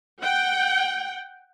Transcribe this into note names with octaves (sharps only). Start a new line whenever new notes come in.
F#5 G5